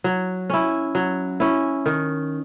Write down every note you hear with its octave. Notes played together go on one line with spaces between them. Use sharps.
F#3
C#4 E4
F#3
C#4 E4
D#3